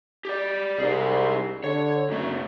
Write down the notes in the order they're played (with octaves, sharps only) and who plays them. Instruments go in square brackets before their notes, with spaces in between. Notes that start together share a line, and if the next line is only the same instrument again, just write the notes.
[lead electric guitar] G4 D5
[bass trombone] C2 [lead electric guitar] D#4 G#4
[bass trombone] D3 [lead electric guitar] C#5
[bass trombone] F#1 [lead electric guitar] B1 A3